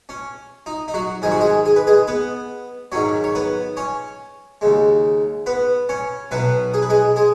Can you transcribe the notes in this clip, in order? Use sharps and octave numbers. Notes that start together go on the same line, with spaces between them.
C#4
D#4
D#4
F#3 F#4
G#2 D#3 G#3 G#4
F#4
G#3 G#4
G#4
B4
G#3 G#4
B3 B4
G#2 D#3 F#3 C#4 C#5
C#5
B3 B4
C#4 C#5
D#2 C#3 G#3
B3 B4
C#4 C#5
B1 B2 F#3 B3 B4
G#4
B4
G#3 G#4
G#3 G#4